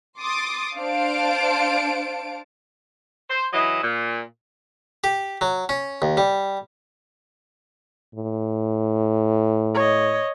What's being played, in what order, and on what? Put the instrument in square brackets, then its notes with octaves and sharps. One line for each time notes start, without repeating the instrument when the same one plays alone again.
[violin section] C6 D6 D#6 A6
D4 C5 F5 A5 D7
[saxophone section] C5
E3 F#3 E4 D#5
A#2
[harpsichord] G4
F#3
C#4
D#2
G3
[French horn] A2
[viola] C#5 D#5